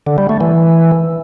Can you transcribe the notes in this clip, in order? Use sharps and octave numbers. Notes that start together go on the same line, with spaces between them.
D3
G3
A3
E3